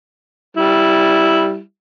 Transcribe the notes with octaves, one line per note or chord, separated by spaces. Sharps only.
G3 E4